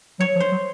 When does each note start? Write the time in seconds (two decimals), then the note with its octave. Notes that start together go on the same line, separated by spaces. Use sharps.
0.20 F#3 C#5
0.36 F3
0.40 C5
0.51 F#3